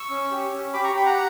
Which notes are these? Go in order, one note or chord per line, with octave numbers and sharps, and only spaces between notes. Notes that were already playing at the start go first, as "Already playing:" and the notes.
Already playing: C#6 E6
C#4
G4
C#4
G4 B5 D6
A#5 C#6
G4 G5 B5
F#5 A#5